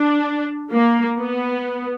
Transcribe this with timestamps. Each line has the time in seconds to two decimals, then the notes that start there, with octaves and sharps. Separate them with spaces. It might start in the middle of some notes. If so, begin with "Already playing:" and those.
Already playing: D4
0.72 A#3
1.19 B3